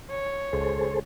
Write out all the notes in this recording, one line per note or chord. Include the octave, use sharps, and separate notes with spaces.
C#5
C#2 G#4 A4 C5